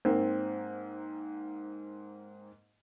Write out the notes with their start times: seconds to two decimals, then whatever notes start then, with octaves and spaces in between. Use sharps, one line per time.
0.05 G#2 A#3 C4